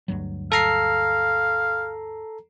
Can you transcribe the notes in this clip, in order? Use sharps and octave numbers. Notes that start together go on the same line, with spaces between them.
D2 G2 F#3
A4 F5 A#5 C7